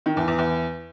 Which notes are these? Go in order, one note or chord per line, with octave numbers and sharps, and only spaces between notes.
D#3
E2
E2
E2